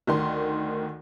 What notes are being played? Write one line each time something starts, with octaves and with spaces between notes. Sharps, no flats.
D2 D#3 C6